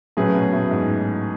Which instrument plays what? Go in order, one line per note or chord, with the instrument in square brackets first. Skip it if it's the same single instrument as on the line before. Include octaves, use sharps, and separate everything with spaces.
[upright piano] A2 [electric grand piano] F#3 C#4 G#4 B4
[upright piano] B2
A2
G#2